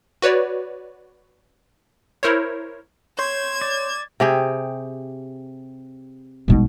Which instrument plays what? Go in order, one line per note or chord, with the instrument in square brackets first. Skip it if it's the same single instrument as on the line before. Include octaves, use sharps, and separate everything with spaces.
[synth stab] F#4 B4 C#5 D5
E4 A#4 C5 C#5
[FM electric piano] C#5 C6 G6 [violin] G#6 E7
[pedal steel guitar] D5
[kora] C3 G4 G#4
[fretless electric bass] A#1 B2 G3 [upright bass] G#3 D#4